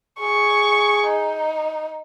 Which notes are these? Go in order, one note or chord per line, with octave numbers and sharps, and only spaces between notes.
G#4 C#6
D#4